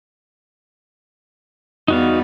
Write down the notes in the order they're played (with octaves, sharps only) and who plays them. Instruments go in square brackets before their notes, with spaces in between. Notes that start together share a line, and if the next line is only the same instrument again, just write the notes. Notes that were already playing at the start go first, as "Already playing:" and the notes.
[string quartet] E2 G3 B3 [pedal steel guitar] D#4 F#4 F5